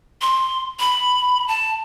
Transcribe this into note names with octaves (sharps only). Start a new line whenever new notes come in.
C6
B5
A5